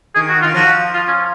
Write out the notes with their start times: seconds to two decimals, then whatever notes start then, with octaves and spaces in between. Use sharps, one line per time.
0.15 D#3 G#4
0.29 F#4
0.42 D#3 F4
0.54 F3 F#4
0.94 F4
1.08 C#4